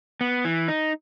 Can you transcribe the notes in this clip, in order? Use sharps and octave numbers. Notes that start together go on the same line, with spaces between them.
B3
E3
D#4